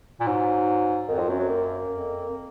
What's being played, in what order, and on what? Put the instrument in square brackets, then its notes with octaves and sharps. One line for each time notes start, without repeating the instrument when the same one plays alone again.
[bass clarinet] A#2
[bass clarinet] G#2 [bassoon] F#3
[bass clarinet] F2 [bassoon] D#3
[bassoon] F3
[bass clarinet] F#2 [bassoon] F#3
[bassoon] F#3
A#3
[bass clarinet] F2